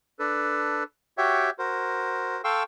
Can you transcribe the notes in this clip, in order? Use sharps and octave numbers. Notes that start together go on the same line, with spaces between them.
D4 A4 B4
F#4 G4 C#5 E5 G5
F#4 A#4 C5
A4 F5 G5 C6 C#6 E6